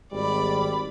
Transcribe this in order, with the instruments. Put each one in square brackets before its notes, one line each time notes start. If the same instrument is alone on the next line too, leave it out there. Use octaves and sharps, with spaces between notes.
[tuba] G#1 [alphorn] G3 [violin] D5 B5